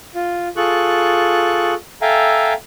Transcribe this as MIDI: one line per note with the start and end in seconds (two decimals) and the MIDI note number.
0.15 0.48 65
0.57 1.74 65
0.57 1.74 68
0.57 1.74 69
0.57 1.74 85
0.57 1.74 90
2.02 2.53 69
2.02 2.53 76
2.02 2.53 77
2.02 2.53 79
2.02 2.53 80
2.02 2.53 82